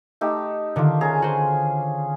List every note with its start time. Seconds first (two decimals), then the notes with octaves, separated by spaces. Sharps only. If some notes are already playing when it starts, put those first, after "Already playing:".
0.21 A3 D#4 G4
0.76 D3 D#3 D4 F4
1.01 C#4 G#4 A#5
1.22 F#4 C5 G#5